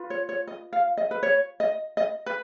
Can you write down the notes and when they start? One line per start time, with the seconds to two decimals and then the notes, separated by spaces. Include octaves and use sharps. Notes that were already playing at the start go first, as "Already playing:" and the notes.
Already playing: F4 B4
0.10 C#5
0.29 C#5
0.47 D#5
0.73 F5
0.97 D#5
1.11 B4
1.23 C#5
1.60 D#5
1.97 D#5
2.26 B4